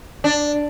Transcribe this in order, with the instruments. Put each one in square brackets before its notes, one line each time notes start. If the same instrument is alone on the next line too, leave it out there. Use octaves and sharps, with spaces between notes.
[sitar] D4